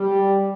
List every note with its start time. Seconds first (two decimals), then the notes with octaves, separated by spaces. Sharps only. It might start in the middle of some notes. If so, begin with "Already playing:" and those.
Already playing: G3